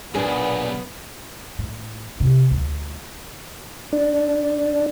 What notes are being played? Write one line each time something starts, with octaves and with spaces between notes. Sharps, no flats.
B1 F#2 A#2 B3 D4 G#4
A2
C3
D2
D4